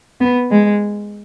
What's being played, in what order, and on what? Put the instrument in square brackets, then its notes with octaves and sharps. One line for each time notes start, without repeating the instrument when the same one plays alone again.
[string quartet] B3
G#3